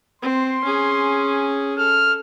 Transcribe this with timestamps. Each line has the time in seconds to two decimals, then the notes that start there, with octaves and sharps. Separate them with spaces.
0.22 C4 C6
0.64 C#4 G#4
1.78 A4 F6